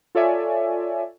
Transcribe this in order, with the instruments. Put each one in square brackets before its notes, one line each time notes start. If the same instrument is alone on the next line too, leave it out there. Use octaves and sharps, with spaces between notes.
[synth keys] F4 A4 C#5 D5 E5 G#5